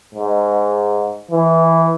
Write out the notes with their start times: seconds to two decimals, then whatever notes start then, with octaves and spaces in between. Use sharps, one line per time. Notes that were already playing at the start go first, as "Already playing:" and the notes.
0.14 G#2
1.31 E3